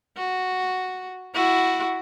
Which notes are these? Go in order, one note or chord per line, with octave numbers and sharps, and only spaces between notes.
F#4
E4 F#4